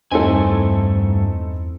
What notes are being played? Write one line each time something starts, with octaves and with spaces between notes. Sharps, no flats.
E2 G2 A3 C4 D#4 E4 A4 G#5